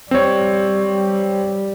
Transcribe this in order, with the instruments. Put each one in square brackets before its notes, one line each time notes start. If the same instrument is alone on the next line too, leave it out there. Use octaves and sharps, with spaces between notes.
[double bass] G3 [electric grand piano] C4 C#5